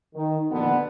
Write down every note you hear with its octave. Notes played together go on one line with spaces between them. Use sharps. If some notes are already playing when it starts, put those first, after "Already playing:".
D#3
A#1 B2 D3 B3